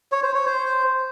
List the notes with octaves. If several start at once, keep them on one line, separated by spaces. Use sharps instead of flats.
C#5
C5
C#5
C5